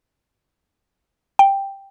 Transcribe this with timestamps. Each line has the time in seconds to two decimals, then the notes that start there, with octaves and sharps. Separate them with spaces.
1.39 G5